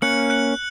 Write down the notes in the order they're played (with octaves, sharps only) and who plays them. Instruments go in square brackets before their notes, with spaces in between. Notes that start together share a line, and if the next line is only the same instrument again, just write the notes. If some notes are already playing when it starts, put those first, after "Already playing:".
[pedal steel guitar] A#3 C#4 [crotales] F#6 C#7 F#7
[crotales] F#6 C#7 F#7